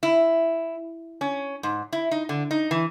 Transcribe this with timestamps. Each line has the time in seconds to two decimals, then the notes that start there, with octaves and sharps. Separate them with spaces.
0.03 E4
1.21 C#4
1.63 G#2
1.92 E4
2.11 D#4
2.29 D3
2.51 D#4
2.71 E3